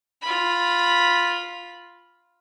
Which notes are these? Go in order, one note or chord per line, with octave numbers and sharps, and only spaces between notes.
F4 B5